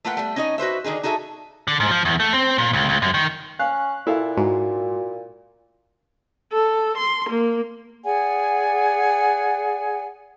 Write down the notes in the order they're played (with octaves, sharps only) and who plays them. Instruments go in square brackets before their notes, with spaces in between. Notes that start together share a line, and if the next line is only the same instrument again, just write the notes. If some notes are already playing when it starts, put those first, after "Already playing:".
[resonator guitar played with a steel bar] A3 A#3 F4 B4 F#5 G5
G3 A3
C#4 D#4 D#5
F#4 B4 C5 E5
D3 D#3 D#4 G#4
D#4 F#4 G#4 A4 E5
[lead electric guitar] D3
G#2
F3
E2
A3
C4
A#2
C#2
C#2
F#2
D#3
[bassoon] C#4 [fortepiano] F5 [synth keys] F#6
[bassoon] A#2 [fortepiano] E4 A4 F5
[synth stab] G#2 [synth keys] F#4
[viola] A4
C6
A#3
[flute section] G#4 D5 F#5 G#5